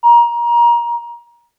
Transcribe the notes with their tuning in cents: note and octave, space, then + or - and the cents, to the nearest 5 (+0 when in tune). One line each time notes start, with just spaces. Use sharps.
A#5 +25